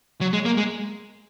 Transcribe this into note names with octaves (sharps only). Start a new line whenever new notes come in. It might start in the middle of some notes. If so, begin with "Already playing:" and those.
F#3
G#3
A#3
G#3